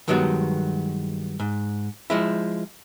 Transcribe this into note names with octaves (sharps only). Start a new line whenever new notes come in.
G2 D#3 F#3 G#3 B3 F#4
G#2
F3 G#3 E4